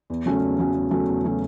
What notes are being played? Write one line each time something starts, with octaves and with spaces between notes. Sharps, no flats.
E2
C#3 F#3 A3 C#4
E2
C#3 F#3 A3 C#4
E2
C#3 F#3 A3 C#4
E2
C#3 F#3 A3 C#4